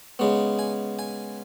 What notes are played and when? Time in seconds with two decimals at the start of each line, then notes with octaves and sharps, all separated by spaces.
0.19 C#3 G#3 B3
0.59 G#5
0.99 G#5